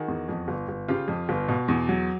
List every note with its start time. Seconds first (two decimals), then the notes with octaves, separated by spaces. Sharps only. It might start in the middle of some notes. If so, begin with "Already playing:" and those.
Already playing: D#3 F#4 G#4
0.08 E2
0.28 F2
0.48 G1
0.69 G1
0.88 C#3 F4 G4
1.08 F2
1.29 G1
1.48 B2
1.68 E2
1.89 F#3